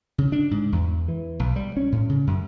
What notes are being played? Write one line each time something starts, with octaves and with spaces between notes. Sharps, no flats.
C#3
D4
G#2
E2
E3
B1
G3
C#4
A2
C#3
F#2